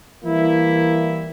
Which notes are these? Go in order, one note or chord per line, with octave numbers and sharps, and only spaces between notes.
E3 G3 A#3 E4